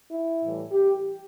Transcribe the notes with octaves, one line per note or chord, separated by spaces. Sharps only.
E4
A2 E3 G3
G4